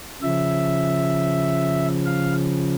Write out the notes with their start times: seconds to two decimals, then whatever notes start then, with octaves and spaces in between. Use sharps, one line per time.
0.22 C#3 F3 E5
2.06 F5